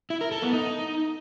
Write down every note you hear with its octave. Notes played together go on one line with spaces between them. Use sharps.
E4
A#4
A4
B3
D#4